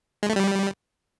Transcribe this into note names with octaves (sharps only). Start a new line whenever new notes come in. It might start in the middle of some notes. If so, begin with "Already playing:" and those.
G#3
A3
G3